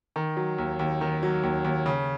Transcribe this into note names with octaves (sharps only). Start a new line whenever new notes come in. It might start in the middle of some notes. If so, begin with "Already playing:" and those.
D#3
F#3
D#2
D#2
D#3
F#3
D#2
D#2
C#3